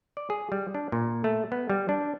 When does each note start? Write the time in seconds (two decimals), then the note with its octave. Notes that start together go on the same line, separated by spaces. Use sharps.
0.17 D5
0.30 G#4
0.52 G3
0.75 D4
0.92 A#2
1.24 A3
1.52 B3
1.70 G3
1.89 D4